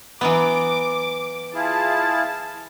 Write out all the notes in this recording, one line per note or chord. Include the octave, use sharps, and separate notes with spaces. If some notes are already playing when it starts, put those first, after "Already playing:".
E3 F#3 B3 D6
E4 F4 G#4 A5